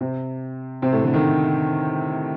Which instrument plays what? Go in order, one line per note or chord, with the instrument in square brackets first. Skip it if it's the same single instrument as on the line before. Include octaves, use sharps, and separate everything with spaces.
[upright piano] C3 C4
C3 C4
A2 A3
D3
D#3